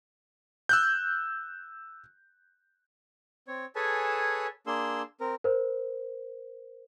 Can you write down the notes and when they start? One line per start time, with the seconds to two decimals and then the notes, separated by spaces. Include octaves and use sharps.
0.69 E6 F#6 G6
3.48 C4 C#5
3.76 G#4 A4 B4 C#5 G#5 A5
4.67 A#3 D4 G#4 C6 E6
5.20 C4 A#4
5.44 A#4 C5